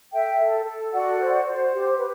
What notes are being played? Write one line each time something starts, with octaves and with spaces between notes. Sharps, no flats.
A4 E5 G5
A4
A4
F#4 D5 F#5
C5
C5
G4
B4